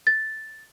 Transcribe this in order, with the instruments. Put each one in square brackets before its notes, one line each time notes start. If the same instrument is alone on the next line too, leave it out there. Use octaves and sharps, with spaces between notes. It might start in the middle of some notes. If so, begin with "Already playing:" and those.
[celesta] A6